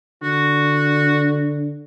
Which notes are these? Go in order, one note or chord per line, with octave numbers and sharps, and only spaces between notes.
D3 F#4